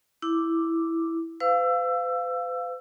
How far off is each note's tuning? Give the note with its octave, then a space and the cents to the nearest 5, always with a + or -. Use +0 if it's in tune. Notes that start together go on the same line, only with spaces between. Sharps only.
E4 +0 D6 +0
B4 +45 F5 +0 E6 +20